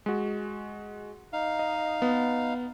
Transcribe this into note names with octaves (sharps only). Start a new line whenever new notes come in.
G#3 F#4
D#4 F5
D#5
B3